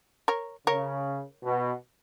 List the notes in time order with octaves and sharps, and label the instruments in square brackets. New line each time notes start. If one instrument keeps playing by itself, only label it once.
[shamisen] A#4 C#5
[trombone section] C#3 [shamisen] A#4 C#5
[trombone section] B2